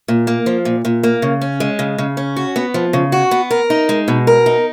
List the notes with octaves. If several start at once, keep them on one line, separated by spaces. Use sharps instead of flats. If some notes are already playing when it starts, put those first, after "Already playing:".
A#2
A#3
F3
A#2
A#2
A#3
C#3
C#4
G#3
C#3
C#3
C#4
F#4
B3
F3
C#3
F#4
B3
A#4
D#4
G#3
B2
A#4
D#4